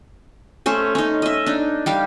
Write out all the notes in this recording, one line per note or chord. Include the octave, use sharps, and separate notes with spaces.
A3 C#4 C5
C#4 D#4
D#5 E5
D4 D#4
G3 G4 F5